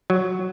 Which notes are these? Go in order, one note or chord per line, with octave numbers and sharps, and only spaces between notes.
F#3